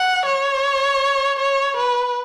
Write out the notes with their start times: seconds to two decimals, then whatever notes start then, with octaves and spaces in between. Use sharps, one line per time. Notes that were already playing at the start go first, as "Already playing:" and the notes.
Already playing: F#5
0.26 C#5
1.39 C#5
1.77 B4